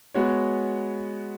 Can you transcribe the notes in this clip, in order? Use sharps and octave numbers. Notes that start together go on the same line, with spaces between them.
G#3 B3 F#4 C#5